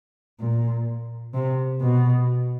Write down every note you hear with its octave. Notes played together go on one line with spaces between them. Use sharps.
A#2
C3
B2